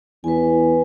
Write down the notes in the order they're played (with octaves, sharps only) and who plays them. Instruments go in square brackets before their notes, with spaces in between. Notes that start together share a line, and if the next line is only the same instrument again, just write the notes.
[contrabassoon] E2 [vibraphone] B4 G#5